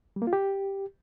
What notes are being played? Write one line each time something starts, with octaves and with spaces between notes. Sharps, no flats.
G3
A#3
F4
G4